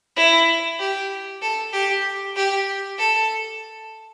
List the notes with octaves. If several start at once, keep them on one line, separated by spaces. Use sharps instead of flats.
E4
G4
A4
G4
G4
A4